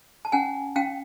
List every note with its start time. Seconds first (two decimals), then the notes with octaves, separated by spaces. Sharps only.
0.25 A5
0.32 C#4 F#5 G#5
0.76 C#4 F5 G5